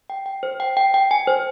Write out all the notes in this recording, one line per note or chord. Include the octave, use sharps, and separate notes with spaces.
G5
G5
C5
G5
G5
G5
G#5
C5